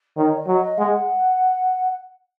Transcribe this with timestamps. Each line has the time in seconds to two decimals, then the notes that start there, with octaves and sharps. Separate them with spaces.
0.17 D#3 C#5
0.37 D#5
0.47 F#3
0.57 D#5
0.78 G#3 F#5